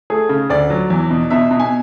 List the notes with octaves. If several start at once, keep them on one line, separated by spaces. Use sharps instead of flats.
A3 G#4
C#3
D2 D5
F#3
E2
B2
B2 E5
B2
G#5